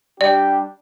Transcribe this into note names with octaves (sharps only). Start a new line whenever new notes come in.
G3 D4 G4 D5